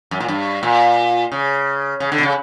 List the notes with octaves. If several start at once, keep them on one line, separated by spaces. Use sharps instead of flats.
F#2
A#2
G2
A#2
C#3
C#3
D3
B2
C#3